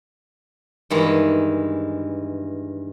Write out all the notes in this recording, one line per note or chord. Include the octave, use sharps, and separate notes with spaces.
G2 D#3 E3 G#3